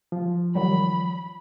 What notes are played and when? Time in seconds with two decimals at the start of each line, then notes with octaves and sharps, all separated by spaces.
0.12 F3
0.55 D#3 F#3 G3 B5